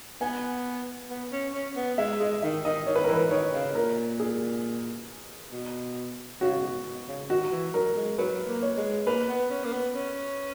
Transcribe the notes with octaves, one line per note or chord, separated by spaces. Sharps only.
B3 G#5
B3
C#4
C#4
B3
G#3 E5
G#3 D#5
D#3 E5
D#3 D#5
D#3 C#5
B4
A#4
E3 B4
D#3 C#5
C#3
A#2 A#4
G#4
B2
C#3 F#4
B2
B2
C#3
D#3 F#4
E3
F#3 A#4
G#3
F#3 B4
A#3
C#5
G#3
A#3 B4
B3
C#4
A#3
B3
C#4